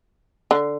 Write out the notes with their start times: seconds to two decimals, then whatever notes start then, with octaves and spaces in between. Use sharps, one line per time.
0.51 D3